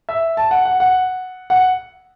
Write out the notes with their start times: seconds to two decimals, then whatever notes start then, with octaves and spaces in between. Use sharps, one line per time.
0.09 E5
0.37 A5
0.51 F#5
0.65 F#5
0.80 F#5
1.50 F#5